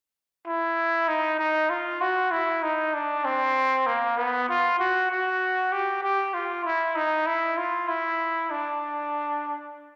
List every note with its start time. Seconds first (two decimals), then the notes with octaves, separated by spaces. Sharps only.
0.47 E4
1.08 D#4
1.39 D#4
1.70 F4
2.01 F#4
2.32 E4
2.63 D#4
2.94 D4
3.25 C4
3.87 A#3
4.17 B3
4.49 F4
4.79 F#4
5.11 F#4
5.72 G4
6.03 G4
6.34 F4
6.65 E4
6.96 D#4
7.27 E4
7.58 F4
7.88 E4
8.51 D4